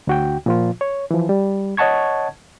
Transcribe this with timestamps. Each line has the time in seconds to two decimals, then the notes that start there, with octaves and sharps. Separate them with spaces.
0.07 D2 F#4 G5
0.46 A#2 F3 F4
0.81 C#5
1.11 E3 F3
1.29 G3
1.77 C#5 D#5 F#5 A5 C#6 G#6